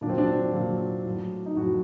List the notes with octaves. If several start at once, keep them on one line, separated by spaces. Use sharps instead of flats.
A#2 F#3 C4 D4
D4
A#2 F#3
A2 F#3
D#4
A2 F#3 F#4